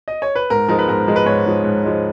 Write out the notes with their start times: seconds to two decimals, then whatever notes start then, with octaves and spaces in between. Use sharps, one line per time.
0.08 D#5
0.22 C#5
0.35 B4
0.50 G#2 A#4
0.68 F3 G#3 D#4 A#4
0.79 B4
0.87 G#2 A#4
1.07 F3 G#3 D#4
1.16 B4
1.26 G#2 C#5
1.46 F3 G#3 D#4
1.64 G#2
1.83 F3 G#3 D#4